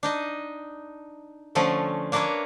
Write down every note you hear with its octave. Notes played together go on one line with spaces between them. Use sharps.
D4 D#4 D#5
D3 F3 A3 C#4 A4
A#3 D4 A#4 B4 C#5 E5